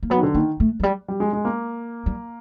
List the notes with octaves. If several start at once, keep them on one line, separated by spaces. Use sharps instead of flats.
A#3
F#3 B3
D#3
D3
D#3 A#3
A3
F#3
G3
G3
G#3
G#3
A#3
G3